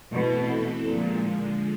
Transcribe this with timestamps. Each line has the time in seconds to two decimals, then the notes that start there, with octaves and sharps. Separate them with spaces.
0.12 B2 E3 A3 C4 E4 A4
0.85 A#2 D3 F3 G#3